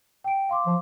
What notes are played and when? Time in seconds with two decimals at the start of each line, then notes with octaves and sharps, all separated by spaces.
0.24 G5 D7
0.49 F5 C6 D6
0.66 F3